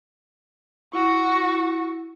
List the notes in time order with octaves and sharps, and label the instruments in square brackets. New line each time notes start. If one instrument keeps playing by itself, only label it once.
[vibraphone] E4 [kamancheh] F#4 C#6